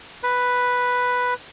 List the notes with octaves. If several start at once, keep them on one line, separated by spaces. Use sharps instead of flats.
B4